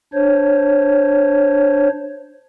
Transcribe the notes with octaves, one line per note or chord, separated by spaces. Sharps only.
D4 C5 C#5